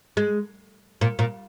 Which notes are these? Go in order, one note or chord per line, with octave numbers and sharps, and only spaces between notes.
G#3
A#2
A#2